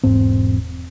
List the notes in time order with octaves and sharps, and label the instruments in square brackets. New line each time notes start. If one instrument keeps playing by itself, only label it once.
[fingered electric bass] E1 G#2 C4